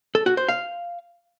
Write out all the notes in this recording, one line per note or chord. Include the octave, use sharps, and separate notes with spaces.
A4
F#4
C5
F5